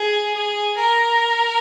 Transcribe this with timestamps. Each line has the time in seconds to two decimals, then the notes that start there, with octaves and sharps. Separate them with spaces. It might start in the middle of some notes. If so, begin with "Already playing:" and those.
Already playing: G#4
0.34 G#4
0.76 A#4